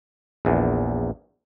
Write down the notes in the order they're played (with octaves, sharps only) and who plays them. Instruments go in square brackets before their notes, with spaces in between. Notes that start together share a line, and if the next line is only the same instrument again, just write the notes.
[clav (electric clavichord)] A#1 E2